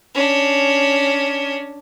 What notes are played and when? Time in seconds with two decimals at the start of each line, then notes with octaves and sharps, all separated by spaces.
0.14 C#4 D4